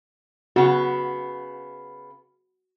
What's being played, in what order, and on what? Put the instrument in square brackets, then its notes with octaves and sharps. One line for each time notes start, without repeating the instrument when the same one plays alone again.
[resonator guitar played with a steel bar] C#3 B3 [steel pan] F#4